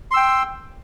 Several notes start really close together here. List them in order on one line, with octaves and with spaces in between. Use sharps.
C6 E6 G5